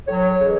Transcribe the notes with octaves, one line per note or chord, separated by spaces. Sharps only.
A2 F#3 C#5
C#3 E3 G#3